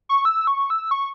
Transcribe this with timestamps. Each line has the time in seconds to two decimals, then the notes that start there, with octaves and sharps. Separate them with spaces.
0.09 C#6
0.25 E6
0.47 C#6
0.70 E6
0.91 C#6